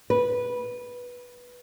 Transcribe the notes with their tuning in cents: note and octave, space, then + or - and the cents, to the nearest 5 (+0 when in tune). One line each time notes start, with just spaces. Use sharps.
B4 -10